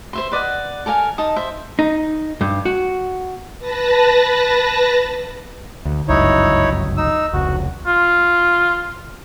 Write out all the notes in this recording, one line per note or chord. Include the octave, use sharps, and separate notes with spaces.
C5 E5 C6
B4 D5 D#5 F#5
A4 A#4 F5 G#5
D#4 A5 D#6
C5 E5
D#4
G2
F#4
B4 A5 A#6
D2
G1 C#2 F#2 D#4 E4 C#5
D#4 E6
F1 C#2 F#4
F4